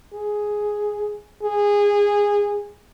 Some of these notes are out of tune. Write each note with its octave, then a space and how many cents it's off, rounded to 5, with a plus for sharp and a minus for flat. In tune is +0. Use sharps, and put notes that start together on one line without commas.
G#4 +5
G#4 -20